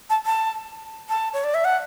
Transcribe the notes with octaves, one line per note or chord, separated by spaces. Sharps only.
A5
A5
A5
C#5
D5
E5
F#5